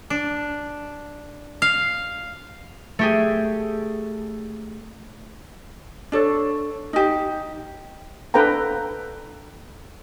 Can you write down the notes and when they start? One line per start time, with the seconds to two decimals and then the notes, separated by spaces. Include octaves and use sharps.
0.10 D4
1.62 F5
2.99 A3 G4 G#4
6.12 D4 A4 C#5
6.93 D#4 G4
8.34 D4 A4 B4 F5 G5 A#5